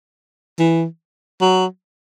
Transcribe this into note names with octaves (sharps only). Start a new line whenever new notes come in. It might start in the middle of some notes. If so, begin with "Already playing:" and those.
E3
F#3